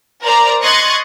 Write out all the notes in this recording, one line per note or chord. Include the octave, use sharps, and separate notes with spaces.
A#4 C5 D5 A#5
D#5 C6 C#6 F#6 G#6 A6